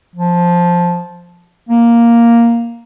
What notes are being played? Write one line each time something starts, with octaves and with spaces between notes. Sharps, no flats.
F3
A#3